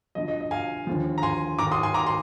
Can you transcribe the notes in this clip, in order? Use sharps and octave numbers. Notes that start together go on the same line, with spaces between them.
F2 D3 F3 D#5
D#5
D#5
F5 G#5
D#2 D3 F3
A#5
G#5 C6
D#2 D#3 A#5 D6
C6 D#6
G#5 C6
A#5 D6
C6